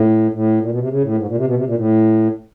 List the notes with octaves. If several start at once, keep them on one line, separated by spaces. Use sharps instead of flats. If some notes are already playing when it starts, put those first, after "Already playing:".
Already playing: A2
A2
A#2
B2
C3
C#3
A2
G#2
A#2
C3
B2
C3
A#2
A2